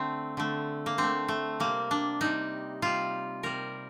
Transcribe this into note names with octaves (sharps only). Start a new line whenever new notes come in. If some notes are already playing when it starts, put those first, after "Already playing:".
Already playing: D3 A3 C4
D3 A3
A#3
D3 A3 C4
A3
C3 G3 A#3
D4
C3 G3 D#4
C3 G3 F4
C3 G3 A#4